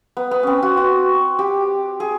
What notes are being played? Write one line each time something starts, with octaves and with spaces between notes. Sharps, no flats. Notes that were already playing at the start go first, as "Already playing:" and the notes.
B3
B3
C4 C#4
F#4
F#4
G4
G#4